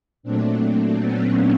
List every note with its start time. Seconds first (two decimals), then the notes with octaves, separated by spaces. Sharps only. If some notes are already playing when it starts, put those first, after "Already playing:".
0.23 A#2 F#3 A3 C4 D4
0.99 B3 C#4